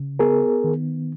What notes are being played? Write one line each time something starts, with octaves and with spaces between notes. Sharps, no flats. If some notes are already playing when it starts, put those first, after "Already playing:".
Already playing: C#3
B3 G#4 A#4
D#3